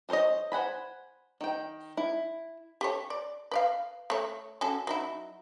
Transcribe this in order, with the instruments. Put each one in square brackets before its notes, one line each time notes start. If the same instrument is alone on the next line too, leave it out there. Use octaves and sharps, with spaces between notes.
[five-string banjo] G#4 A4 C5 C#5 D#5
C5 F#5 G#5 B5
D#3 G5
E4
[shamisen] G4 A4 C#5
D5
B4 D5 F5
A3 C#5
F#3 C#4 A4
F#3 D#4 E4